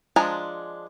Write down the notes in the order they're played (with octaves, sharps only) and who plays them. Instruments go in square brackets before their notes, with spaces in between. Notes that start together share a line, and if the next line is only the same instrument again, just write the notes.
[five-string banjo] F3 G#3 D4 G#5 A#5